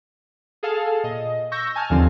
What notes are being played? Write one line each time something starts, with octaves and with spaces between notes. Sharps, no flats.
G#4 A4 F5 A5
A#2 D#5
C#6 E6 G6 A#6
G#5 A5 F6
D#2 D3 F3 C4